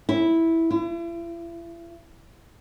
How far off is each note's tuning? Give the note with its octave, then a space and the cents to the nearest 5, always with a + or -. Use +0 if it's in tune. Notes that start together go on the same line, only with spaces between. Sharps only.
E4 -5
E4 +40